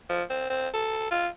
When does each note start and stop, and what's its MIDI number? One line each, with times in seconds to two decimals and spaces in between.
0.10 0.23 53
0.30 0.49 60
0.50 0.69 60
0.74 1.11 69
1.11 1.27 65